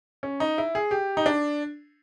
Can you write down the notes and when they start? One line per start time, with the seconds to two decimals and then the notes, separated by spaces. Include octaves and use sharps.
0.23 C#4
0.40 D#4
0.58 E4
0.75 G#4
0.91 G4
1.17 D#4
1.26 D4